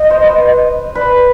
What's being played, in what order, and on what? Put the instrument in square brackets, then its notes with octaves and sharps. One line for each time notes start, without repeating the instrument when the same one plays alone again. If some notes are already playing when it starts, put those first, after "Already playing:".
Already playing: [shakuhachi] D#5
[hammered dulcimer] C5
B4
[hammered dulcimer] B4 [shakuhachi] D5